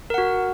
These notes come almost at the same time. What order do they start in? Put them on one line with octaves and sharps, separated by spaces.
A#4 F#5 F#4